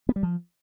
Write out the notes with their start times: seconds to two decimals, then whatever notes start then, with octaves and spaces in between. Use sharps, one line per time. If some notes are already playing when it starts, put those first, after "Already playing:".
0.09 B3
0.16 G3
0.23 F3